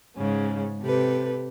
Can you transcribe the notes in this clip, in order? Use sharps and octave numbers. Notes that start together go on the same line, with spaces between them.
G#2 C#3 C#4
C3 G4 A4 B4